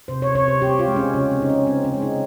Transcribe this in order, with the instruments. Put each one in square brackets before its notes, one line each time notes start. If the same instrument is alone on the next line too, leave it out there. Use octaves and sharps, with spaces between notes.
[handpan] C3 C5
C#5
C3 C#5
C5
C4 G4
F4
G#3
C#4
C#3 C#4
C4
C#3 D#4
C#4
C4
C#4
G#3
D#4